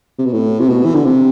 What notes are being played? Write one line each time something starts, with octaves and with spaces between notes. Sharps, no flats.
C3
B2
A2
C3
B2
E3
D3
C3